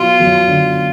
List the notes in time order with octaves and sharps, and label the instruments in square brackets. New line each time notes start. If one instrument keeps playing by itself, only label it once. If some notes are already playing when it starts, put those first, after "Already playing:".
Already playing: [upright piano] B2 F#3 [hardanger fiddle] F4
[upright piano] F#2
D3